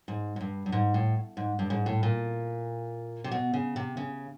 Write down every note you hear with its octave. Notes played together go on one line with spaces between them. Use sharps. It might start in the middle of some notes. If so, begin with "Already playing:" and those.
G#2
G#2
G2
G2
G#2
A2
G#2
G2
G#2
A2
A#2
C3
B2
C#3
C3
C#3